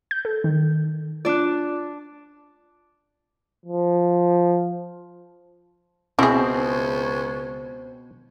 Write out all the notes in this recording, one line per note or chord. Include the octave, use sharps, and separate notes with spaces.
G6
A4
D#3
D4 F4 D5 D6 F#6
F3
C#2 B2 C4 E4 G#4